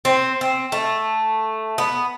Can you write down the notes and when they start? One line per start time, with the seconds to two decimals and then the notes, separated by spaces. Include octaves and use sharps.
0.05 C4
0.41 C4
0.72 A3
1.78 B3